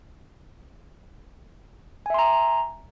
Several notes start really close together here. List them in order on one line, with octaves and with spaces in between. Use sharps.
G#5 E5 C6 A#5